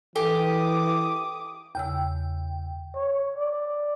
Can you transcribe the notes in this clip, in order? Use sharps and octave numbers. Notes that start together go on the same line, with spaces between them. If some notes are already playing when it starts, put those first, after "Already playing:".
E3 G4 A4 D6 D#6
E2 C#3 G5 E6
C#5
D5